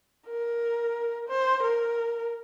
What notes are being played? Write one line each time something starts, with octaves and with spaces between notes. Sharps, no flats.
A#4
C5
A#4